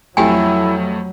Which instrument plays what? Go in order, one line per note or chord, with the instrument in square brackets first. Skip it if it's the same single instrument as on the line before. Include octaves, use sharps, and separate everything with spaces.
[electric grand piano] F2 A3 [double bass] F#3 [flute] E4 [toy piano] G4 G5 G#5